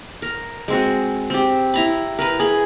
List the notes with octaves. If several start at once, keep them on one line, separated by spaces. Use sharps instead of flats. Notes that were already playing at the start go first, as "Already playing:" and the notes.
A#4
G#3 C4 F#4
C4 G4
E4 A#5 B5
A#4 B4 B5
G#4 B5